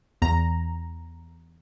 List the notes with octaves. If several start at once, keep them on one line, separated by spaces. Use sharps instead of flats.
E2 A#5